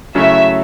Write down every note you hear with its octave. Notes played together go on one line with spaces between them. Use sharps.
C#3 F#3 A3 C#4 E4 E5